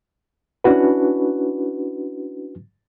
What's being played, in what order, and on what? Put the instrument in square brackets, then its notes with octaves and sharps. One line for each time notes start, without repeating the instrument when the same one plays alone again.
[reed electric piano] C#4 D4 E4 F#4 B4